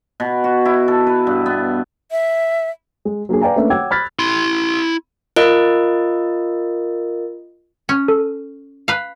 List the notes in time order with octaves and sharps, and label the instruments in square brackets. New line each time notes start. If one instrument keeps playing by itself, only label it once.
[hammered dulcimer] B2
F#4
E4
A4
B4
G2
B3
[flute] E5
[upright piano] G#3
F#3 A#3 D4 G#4
B4 D5 F5 G5 G#5 A#5
A3 A#3 C#4 D4 B4 E5
C#5 F#5 G5 D6 E6 G#6
B5 F6 F#6 G#6 A6 B6
[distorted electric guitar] E4 C6
[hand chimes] F4 A#4 D#5
[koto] C#4
[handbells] A4
[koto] B4 F5